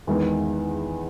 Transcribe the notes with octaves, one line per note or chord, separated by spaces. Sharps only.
E2 D#3 G#3 B3